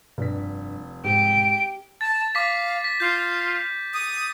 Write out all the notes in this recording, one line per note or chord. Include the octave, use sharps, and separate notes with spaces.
F1 G2 G3 B6
G#2 G4 D7
A5 A6
F5 D6 B6
B6
F4 G6
D#6